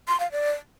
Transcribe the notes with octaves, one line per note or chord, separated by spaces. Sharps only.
C6
F5
D5